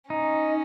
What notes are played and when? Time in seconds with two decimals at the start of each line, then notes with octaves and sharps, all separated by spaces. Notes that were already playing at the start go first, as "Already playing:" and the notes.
0.10 C#4 D#4